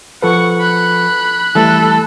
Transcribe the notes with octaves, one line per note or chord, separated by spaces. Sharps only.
F3 A4 B4 F#5 C#6
B5 F#6
E3 G3 A3 A4